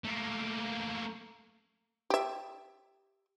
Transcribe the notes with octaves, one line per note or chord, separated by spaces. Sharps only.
A3 A#3
G4 E5